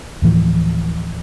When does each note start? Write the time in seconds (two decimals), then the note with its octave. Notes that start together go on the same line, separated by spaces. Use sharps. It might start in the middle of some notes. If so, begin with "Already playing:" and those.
0.22 D1 A2 E3 F3